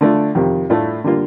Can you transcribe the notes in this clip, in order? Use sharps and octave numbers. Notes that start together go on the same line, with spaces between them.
D3 A3 D4 F4
F2 C3 D#3
A2 A3 D4 F4
D3 G3 A#3 F4